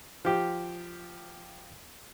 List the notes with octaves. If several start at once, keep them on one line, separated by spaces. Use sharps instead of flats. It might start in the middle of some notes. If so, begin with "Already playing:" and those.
F3 G4